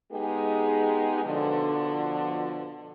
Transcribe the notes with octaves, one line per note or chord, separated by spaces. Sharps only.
G#3 B3 D#4 G4 G#4
B2 D3 F3